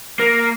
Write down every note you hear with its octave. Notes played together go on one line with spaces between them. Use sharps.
A#3